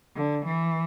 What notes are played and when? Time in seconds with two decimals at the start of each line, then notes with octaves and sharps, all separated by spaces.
0.16 D3
0.46 E3